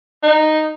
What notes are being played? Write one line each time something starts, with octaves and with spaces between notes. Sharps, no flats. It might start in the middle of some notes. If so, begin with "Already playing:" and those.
D#4